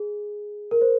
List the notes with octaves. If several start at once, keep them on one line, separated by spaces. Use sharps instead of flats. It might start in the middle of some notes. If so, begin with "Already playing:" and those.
Already playing: G#4
A#4
C5